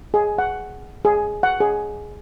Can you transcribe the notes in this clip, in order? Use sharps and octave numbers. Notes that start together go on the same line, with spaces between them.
G#4
F#5
G#4
F#5
G#4